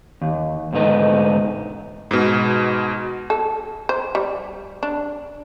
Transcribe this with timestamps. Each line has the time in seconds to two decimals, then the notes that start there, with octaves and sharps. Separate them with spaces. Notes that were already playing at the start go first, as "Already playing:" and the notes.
0.21 D#2
0.73 D2 G#2 B3 D#4 A4
2.11 G#2 B2
3.30 A4
3.89 C5
4.15 G3
4.83 D4